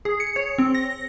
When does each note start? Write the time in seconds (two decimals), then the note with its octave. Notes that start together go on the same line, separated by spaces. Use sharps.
0.05 G#4
0.20 C#7
0.36 C#5
0.58 C4
0.74 A#6